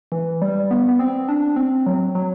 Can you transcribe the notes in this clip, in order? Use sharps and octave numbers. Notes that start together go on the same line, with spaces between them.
E3
G3
B3
B3
C4
D4
C4
F#3
F#3